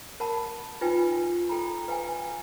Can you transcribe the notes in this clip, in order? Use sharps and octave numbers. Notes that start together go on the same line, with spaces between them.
A#4 F#5 A5 B5
D#4 F4 B4 G5 G#5
A4 G5 A#5 B5
B4 F5 G5 G#5